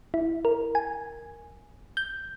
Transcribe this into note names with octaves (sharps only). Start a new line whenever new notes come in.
E4
A#4
G#5
G6